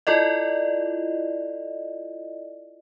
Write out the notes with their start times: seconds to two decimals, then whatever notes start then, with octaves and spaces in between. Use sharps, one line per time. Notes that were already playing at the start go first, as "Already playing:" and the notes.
0.07 E4 F4 A4 D5 D#5